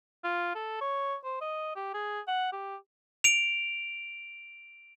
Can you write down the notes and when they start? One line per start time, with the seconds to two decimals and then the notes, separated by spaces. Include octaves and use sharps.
0.24 F4
0.55 A4
0.81 C#5
1.25 C5
1.41 D#5
1.76 G4
1.94 G#4
2.27 F#5
2.53 G4
3.24 D7 F7